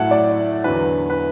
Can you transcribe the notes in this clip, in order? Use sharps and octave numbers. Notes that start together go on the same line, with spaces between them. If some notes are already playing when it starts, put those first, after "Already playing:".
Already playing: A2 F#3 A3 E4 F#5 A5
D5
E2 D3 F#3 B4
B4